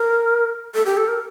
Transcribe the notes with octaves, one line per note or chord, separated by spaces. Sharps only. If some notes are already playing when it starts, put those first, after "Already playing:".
Already playing: A#4
A4
G4
A4
A#4